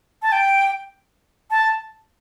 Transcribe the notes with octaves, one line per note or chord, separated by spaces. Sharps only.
A5
G5
A5